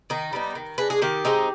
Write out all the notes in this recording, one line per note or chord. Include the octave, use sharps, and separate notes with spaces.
D#3 D#4
G3 B3 D#4
D#3
G#3 D4 B4
G#4
D#3 G4
G#3 C4 D#4